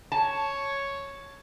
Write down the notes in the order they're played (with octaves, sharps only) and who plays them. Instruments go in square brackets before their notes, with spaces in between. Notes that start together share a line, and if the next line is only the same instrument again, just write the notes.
[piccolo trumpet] C#5 [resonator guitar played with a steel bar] A5